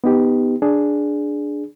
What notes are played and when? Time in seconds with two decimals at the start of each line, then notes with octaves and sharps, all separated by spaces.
0.04 B3 D#4 G4
0.62 D4 G#4